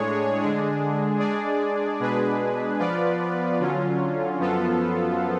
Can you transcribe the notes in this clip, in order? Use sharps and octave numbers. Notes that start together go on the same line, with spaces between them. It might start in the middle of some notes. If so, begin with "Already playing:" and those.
Already playing: A2 G#3 D4 G#4 C#5
D3 G#3 D4 G#4
G#3 D4 G#4 D5
B2 G#3 D4 G#4 B4
F3 B3 F4 B4 D5
D3 F#3 C#4 F4
F#2 F3 B3 F4 A4